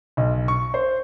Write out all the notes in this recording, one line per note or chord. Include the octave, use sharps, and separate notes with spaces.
B1
C#6
C5